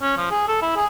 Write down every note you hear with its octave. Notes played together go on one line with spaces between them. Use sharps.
C#4
F3
G#4
A4
E4
G#4